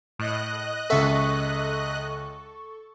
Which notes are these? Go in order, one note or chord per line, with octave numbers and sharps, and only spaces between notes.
A2 D#5 F#6
C#2 A4 E5 C#6